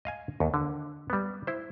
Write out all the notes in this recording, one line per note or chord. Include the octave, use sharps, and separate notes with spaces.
D#5 F5 G#5
D#2
D3
G3 B3
E4 C5